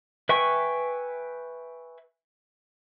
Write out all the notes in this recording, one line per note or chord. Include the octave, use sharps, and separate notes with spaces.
B4 E5 G5 G#5 C#6